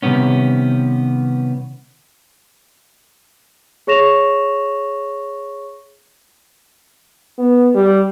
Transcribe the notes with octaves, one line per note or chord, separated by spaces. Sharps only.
C3 D#3 G3 B3 C#4
G#4 C#5 C#6 A#6 E7 F7
B3
G3